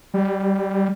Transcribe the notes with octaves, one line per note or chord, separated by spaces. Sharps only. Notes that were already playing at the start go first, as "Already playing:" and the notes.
G3